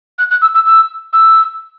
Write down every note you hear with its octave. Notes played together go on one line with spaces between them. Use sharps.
F#6
F#6
E6
E6
E6
E6